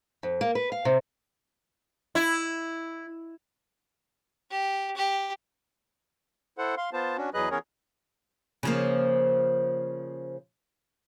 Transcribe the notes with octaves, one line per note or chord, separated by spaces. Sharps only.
F2
A#3
B4
F5
C3
E4
G4
G4
E4 A4 C5 F#5
F5 C6
B3 F4 C5 A5
C#4 D4 F#4
E2 F#3 G#4 B4 D#5 F#6
E3 B3 C#4 G#4 A#4 C#5
C#3 F3 A#3